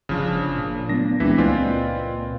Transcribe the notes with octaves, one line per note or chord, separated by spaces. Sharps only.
G1 C#3 F3 D4
A#2
F#3 A3 B3 D4 A#6
C#2 E3 G#3 C4 G4 E5
C#2 A#3 C4 F4 B4 D5 D#5 G#5